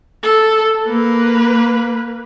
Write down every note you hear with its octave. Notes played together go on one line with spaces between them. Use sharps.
A4
A#3 B4